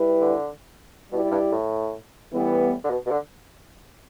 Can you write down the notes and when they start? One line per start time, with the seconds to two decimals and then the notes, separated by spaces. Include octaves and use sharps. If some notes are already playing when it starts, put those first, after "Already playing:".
Already playing: G3 E4 G4 B4
0.21 D3
1.11 B2 G3 E4 G4 D5
1.31 G2
1.51 A2
2.31 A2 E3 G3 B3 G4
2.84 D3
2.90 B2
3.06 B2
3.11 D3